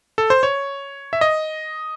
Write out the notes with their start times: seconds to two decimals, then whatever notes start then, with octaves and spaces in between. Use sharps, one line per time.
0.18 A4
0.30 C5
0.43 C#5
1.13 E5
1.21 D#5